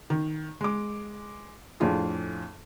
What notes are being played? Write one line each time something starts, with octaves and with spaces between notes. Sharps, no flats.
D#3
G#3 D6
F2 A2 D4 F4 G#4